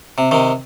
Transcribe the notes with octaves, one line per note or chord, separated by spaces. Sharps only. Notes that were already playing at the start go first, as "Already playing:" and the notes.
C3
C3 D#3